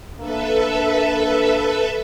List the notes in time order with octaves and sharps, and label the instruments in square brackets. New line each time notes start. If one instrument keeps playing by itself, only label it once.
[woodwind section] A#3 D4 [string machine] A4 B4 E5